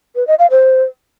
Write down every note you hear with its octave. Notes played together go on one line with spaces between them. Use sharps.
B4
D#5
F5
C5